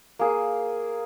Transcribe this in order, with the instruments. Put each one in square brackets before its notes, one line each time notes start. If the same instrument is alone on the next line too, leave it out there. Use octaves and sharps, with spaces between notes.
[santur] A#3 G#4